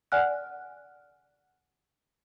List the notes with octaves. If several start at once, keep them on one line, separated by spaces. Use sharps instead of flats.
D5 F#5 G#5 F6 F#6